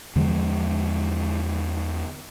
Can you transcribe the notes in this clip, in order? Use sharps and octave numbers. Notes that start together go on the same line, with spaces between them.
E2 D3 F3 G#3